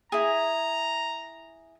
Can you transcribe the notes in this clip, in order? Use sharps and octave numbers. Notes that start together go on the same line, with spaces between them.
E4 G#4 A#5